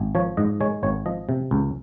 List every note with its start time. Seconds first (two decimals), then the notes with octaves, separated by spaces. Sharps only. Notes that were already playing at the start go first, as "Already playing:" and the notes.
Already playing: G#1
0.15 F3 C#5
0.37 G#2 D#5
0.60 G#3 C#5
0.83 G#1 C#5
1.06 F3 D#5
1.29 C3
1.51 C#2